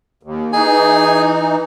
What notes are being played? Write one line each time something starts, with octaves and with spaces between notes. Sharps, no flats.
D#2
E3 D#4 G#4 G#5